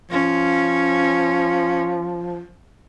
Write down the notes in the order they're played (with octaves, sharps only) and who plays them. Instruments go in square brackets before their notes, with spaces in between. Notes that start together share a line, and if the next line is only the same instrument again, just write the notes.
[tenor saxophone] F3 [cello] C#4